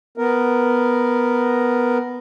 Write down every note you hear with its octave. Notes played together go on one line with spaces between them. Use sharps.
B3 A#4